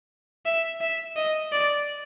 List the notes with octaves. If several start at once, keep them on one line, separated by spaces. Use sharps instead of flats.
E5
E5
D#5
D5